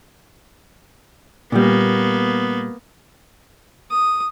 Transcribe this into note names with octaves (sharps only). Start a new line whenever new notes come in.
A#2 G3 A#3 B3
D#6